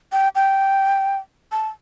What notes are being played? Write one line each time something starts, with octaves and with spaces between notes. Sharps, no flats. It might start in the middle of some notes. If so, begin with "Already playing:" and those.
G5
G5
A5